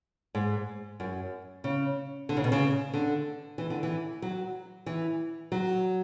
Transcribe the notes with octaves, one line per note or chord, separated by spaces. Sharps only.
G#2
F#2
C#3
D3
C#3
B2
C#3
D3
E3
D3
E3
F#3
E3
F#3